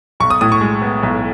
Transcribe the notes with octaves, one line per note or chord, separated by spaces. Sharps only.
B1 C#6
D#6
A2 D#6
C#6
G#3
B3
B1